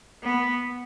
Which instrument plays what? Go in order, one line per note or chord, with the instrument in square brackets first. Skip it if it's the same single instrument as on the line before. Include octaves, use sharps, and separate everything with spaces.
[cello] B3